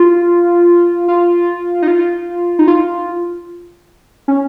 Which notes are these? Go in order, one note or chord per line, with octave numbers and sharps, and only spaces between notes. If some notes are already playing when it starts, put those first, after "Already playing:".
Already playing: F4
F4
D#4
F4
D#4
F4
C#4